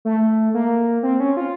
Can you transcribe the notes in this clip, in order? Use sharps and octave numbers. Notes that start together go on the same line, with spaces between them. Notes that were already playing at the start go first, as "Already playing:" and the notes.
A3
A#3
C4
C#4
F4